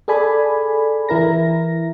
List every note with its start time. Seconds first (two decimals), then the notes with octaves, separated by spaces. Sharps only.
0.08 G#4 A4 D5 G#5 B5
1.09 E3 E4 A#4 A#6